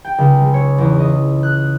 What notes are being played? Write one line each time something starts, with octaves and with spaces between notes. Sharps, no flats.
G5
C#2
G#3
C#5
E2
D#5
F#6